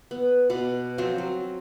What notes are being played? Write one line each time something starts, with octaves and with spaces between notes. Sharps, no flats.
B3
B2 B3 D5
F3 F#3 C4 F4
F#3